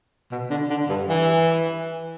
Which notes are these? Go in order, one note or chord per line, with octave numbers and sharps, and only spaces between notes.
B2
D3
D3
G2
E3